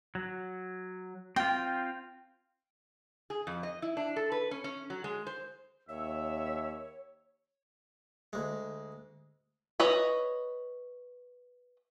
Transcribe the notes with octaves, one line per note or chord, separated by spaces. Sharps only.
F#3
C4 F4 G5
G#4
F2
D#5
E4
D4
A4
B4
C#4
C#4
F#3
G#3
C5
D#2 C#5 E5 E6
D2 G#3
B4 C#5 D#5